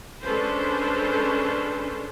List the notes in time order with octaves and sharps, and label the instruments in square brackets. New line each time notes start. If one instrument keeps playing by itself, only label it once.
[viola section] G#3 C#4 D4 A4 B4 C5